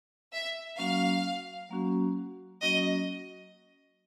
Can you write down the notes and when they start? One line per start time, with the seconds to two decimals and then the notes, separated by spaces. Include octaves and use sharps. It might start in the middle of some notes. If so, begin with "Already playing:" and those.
0.33 E5
0.78 F#3 A#3 C#4 F#4 F5
1.70 F#3 A#3 C#4 F#4
2.62 F#3 A#3 C#4 F#4 D#5